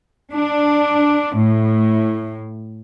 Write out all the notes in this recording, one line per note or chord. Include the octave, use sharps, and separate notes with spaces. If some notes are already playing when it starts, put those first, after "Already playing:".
D4
A2